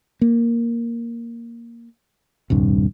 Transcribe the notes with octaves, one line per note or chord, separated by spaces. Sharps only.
A#3
D#1 C2 G2